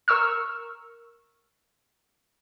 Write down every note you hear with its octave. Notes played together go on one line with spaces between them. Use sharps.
A#4 C#6 E6 F6